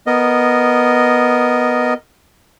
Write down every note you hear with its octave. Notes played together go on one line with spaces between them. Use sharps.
B3 A#4 D#5